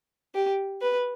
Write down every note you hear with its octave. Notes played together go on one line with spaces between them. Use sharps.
G4
B4